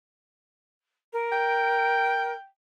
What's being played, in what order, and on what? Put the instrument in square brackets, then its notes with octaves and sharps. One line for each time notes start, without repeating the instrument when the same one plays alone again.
[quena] A#4
[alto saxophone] G5